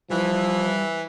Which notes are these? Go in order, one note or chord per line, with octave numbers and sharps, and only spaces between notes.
E3 F3 G3